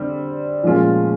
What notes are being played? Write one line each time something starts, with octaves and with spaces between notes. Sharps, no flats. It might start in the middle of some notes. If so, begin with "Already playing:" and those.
Already playing: D3 G3 C4
A#2 F3 G#3 C#4 F4